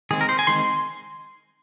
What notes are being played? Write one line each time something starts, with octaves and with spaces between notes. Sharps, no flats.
D#3 G#3 C4 G#4
A#4
C5
G#5
D#3 G#3 C4 C6